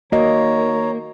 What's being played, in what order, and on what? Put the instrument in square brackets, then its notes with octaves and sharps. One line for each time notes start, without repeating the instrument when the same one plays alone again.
[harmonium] D#3 C#5 A#5 [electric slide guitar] A#3 [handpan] F#4 D#5